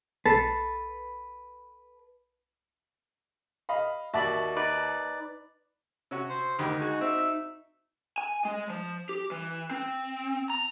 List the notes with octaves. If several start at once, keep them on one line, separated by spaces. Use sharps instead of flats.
B1 A4 B4 A5 C7
D#5 F5 B5
D#2 F#4 D5 E5 A5 B5
D#4 B4 D5
C3 C#4 F#4
C5
D2 D#3 D#4 G4 B5
G#3 F#4 G#5
C4 F#4 E5
G#5
G#3
F3
G4
E3
C4
A#5